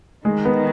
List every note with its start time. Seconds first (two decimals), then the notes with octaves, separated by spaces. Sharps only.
0.25 D#3 G#3
0.45 B3